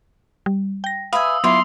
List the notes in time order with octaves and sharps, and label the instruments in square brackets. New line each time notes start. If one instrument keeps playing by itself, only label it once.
[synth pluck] G3
G5 A#6
[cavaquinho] B4 E5 G#5 [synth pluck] F5 [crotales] D#6 E6
[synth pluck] F#3 B3 [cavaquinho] E4 F4 D5 [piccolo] C6 [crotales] F7